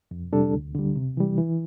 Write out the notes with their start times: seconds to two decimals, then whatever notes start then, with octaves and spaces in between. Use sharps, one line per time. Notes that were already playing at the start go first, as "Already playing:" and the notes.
0.11 F2
0.33 C3 G3 D4 A4
0.54 D2
0.75 D3 G3
0.96 C3
1.17 E3 G3
1.38 E3